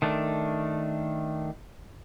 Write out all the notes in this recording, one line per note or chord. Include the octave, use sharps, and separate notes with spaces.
D#3 A3 D4